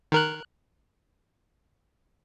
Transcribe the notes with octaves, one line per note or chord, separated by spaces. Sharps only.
D#3 A#4 F#6